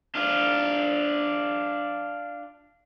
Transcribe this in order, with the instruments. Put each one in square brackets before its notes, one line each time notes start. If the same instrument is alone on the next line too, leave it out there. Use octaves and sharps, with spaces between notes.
[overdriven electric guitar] D4 F4